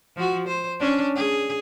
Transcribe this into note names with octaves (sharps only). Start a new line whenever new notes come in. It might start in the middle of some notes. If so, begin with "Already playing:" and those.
F3 F#4
C5
C#4 D4
G#4